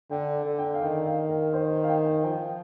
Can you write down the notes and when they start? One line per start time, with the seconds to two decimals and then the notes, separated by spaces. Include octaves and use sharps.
0.11 D3 G5
0.46 D3
0.58 G5
0.74 F5
0.82 D#3 G5
1.06 F5
1.29 A#4
1.53 C5
1.71 A#4
1.84 F5
1.89 G5
2.07 G5
2.24 F3 G5